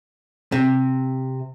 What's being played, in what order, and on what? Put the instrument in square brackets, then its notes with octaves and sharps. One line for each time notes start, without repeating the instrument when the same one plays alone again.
[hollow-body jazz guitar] C3